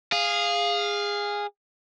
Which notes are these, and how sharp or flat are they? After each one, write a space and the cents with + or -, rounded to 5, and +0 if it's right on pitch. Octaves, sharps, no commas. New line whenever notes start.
G#4 -15 F5 +0